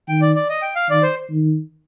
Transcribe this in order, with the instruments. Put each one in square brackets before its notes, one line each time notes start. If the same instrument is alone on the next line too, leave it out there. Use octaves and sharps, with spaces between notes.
[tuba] D#3 [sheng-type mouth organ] G5
[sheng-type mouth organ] D5
D5
D#5
G5
F5
[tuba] D#3 [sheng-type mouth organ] D5
[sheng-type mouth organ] C5
[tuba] D#3